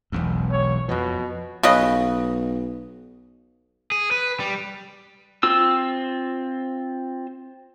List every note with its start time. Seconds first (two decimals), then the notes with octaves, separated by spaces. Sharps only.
0.12 E1 B1 E2
0.51 C#5
0.89 F2 B2 F3
1.63 B1 C#3 B4 D#5
3.92 G#4
4.11 B4
4.40 G3
5.43 C4 F4 E6